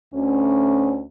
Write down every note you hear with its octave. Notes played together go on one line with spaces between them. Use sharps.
D2 C#4